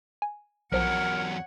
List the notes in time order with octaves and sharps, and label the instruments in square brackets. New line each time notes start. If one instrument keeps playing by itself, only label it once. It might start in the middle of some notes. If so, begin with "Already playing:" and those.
[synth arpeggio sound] G#5
[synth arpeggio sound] B1 F3 [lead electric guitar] E2 F#3 [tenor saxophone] A#4 [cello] C#5 F#5